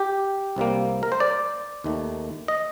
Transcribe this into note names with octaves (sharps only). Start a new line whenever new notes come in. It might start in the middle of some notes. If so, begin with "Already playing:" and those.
Already playing: G4
C2 C3 G3 A#3
A#4
C5
D5
D#2 D#3 A3
D#5